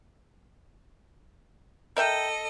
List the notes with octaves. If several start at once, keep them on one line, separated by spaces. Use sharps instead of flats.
A4 A#4 D#5 E5 G5